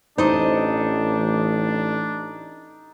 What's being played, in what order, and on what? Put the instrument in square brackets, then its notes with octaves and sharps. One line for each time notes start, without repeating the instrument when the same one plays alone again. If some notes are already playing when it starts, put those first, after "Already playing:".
[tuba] A1 [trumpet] D4 [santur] D#4 [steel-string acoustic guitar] C5 D#5